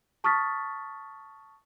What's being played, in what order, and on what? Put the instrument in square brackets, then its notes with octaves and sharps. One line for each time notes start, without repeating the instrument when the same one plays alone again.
[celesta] A5 C#6 D#6 F6 A6 B6